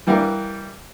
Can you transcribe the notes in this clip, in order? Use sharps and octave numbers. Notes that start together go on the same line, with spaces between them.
E3 G3 A#4 F5